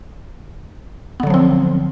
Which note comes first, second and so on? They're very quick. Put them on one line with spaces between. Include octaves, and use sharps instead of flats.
B3 D3 F#3 F3 C4